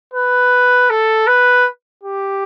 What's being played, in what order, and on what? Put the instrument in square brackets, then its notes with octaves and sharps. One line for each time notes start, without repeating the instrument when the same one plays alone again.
[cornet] B4
A4
B4
G4